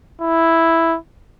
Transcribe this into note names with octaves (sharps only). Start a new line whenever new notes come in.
E4